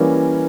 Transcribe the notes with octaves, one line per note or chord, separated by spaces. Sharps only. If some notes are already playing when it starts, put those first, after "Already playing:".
Already playing: E3 G3 A#3 C#4